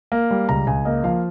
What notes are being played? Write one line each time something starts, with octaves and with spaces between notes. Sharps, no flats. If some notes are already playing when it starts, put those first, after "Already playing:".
A#3
G3
C#2 A#5
C#2 G#5
A#3 D#5
F3 F5